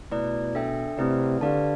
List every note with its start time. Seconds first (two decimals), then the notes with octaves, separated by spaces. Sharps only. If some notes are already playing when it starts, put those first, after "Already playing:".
0.11 B2 A3 E4 B4 D5
0.55 D4 A4 E5 G5
0.97 C3 A3 C4 E4 B4 D5
1.41 D3 G4 B4 D5 F5 A5